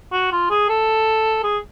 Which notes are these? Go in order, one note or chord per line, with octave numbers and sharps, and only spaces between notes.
F#4
F4
G#4
A4
G#4